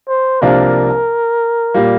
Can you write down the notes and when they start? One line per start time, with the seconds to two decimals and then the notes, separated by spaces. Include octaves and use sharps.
0.08 C5
0.41 C2 C3 F3 A#3 D4 A#4
1.74 A#2 G3 A#3